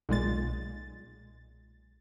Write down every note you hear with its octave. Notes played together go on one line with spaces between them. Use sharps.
B1 A#2 G#3 A6